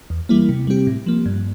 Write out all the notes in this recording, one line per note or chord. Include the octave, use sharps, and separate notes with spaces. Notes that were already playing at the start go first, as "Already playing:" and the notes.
E2
E3 G3 A#3 E4
C3
G3 C4 G4
A2
F3 A#3
G2